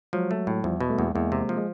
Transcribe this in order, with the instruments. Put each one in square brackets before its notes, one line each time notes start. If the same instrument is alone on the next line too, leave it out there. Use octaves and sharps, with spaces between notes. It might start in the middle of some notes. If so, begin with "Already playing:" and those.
[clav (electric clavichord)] F3 [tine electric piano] F#3 G#3
[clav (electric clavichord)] A3
A2
[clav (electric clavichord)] E2 [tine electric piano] F3 G3
[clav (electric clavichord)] B2
[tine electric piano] G3 A3
[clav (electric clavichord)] E2 [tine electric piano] G#3 A#3
[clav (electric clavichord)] E2 [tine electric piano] G#3 A#3
[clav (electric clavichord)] C3
F3
[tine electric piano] G#3